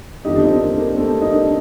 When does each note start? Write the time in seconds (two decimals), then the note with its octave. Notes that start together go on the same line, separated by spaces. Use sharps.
0.24 G1 F2 D3 D#4 G4
0.36 D4
0.43 C4 D#4
0.61 A#3 D4
0.78 A#3 D4
0.97 A3 C4
1.21 D#4
1.32 A#3 D4